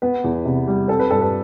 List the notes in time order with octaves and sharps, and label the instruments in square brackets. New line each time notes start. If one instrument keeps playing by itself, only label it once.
[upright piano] B3 B4
E2
C3
G3
C4 A4
B4
G2 A4
B4